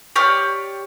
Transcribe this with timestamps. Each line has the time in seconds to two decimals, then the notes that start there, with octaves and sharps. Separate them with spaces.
0.16 G4 C#5 D5 F6